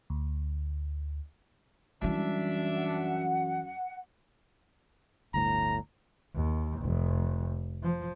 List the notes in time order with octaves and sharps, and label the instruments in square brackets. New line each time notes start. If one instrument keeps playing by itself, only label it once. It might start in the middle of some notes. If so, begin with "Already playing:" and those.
[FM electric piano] D2
[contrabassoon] F#2 [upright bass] E3 G3 [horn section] D4 E5
[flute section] F#5
[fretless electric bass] G1 D2 A2 [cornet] A#5
[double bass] D#2
F1
F3